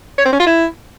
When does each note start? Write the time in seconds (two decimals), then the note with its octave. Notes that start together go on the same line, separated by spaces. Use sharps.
0.18 C#5
0.25 C4
0.32 C#4
0.39 F4
0.46 E4